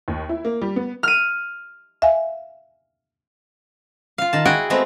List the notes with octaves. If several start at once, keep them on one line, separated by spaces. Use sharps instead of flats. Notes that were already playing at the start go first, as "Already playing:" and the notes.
D#2
E4
A#3
G3
B3
F6 D#7
E5 F5 G#5
F4 F5
D#3 A5
E4 F#4 G#4 F#5 G5
G#3 A3 B3 C4